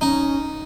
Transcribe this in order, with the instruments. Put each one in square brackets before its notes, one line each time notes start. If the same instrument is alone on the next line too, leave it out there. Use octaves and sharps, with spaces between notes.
[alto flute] C#4 [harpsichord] D#4